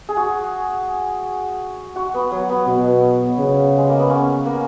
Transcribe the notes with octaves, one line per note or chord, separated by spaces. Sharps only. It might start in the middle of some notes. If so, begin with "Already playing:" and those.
G#4
F#4
F#4
B3
F#3
B3
B2
C#3
G#3
A#3
B3
C#4
A#3